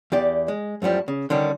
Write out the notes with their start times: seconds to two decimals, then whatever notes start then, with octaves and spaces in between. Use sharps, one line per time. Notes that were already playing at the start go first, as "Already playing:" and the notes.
0.12 E2 G4 D5
0.48 G#3
0.82 F#2 A2 F3 G3
1.08 C#3
1.30 D3 D#3 G3 C#4